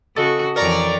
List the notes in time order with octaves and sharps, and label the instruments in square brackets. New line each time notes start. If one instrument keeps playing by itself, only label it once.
[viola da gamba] C#3 F#4 [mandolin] A4 D#5
[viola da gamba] F2 E3 C#5 [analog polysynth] A#4 D5 A#5